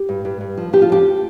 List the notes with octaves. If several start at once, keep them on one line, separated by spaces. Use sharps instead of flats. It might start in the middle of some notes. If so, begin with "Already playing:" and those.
Already playing: G4
G2
G2
G2
F3
F3 G4
F4
F2 G4